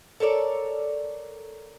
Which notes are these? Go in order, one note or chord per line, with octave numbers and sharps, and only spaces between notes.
A4 A#4 C#5 D5